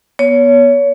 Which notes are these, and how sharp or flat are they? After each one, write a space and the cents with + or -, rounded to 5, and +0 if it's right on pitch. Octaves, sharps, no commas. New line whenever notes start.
B3 -25 C#5 +25